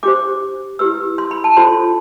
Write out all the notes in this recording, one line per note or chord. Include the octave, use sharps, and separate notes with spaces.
D4 G4 C5 D6
E4 G4 B4 E6
C6
B5
A5
D4 F4 A4 C5 C6